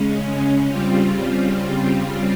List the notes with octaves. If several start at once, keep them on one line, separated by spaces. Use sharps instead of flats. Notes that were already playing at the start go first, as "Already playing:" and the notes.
Already playing: C#3 G#3 C#4
C#3 G3 C4 F4